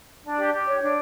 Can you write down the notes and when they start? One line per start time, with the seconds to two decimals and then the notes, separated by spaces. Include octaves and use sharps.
0.24 D4
0.38 G4
0.53 G4
0.67 C#5
0.82 D4